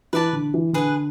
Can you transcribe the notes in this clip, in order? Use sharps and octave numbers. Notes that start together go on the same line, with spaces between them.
E3 B4 D5 A5
D3
E3
D3 G#4 B4 F#5